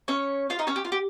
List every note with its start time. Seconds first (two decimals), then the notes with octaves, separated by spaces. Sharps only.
0.08 C#4 C#5
0.50 F4 F5
0.59 D#4 D#5
0.67 C#4 C#5
0.76 G4
0.85 F4
0.92 G4